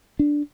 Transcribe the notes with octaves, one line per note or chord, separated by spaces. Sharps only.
D4